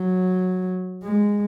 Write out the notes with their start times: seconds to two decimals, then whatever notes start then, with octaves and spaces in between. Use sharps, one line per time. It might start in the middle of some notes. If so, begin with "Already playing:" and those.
Already playing: F#3
1.03 G#3